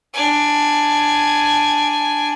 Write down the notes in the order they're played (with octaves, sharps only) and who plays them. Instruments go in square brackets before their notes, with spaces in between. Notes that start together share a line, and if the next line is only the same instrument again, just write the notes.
[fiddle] D4 G#5